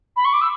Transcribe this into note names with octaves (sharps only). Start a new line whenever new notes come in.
B5
C#6
D6
E6